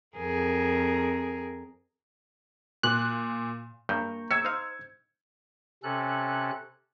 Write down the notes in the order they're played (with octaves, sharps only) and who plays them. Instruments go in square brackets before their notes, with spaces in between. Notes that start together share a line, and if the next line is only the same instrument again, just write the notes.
[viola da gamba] F2 G#4 A#4
[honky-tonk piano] A#2 [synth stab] F#6
[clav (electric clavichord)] G2 [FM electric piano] A#3 A#5 C#6 [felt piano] G6
[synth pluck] E6 [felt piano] G#6 C#7
[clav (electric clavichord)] D#4 F5 [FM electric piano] C5
[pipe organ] C3 C#4 A4 F#6